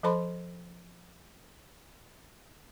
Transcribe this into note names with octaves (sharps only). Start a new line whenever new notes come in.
F3 A4 C5 A5 B5 C6